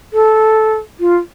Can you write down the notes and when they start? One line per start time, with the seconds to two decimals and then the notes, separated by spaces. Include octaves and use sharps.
0.13 A4
1.00 F4